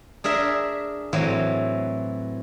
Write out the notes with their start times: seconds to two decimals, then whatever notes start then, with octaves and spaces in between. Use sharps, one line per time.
0.24 D4 G#4 A#4 E5
1.13 A2 E3 F#3 C4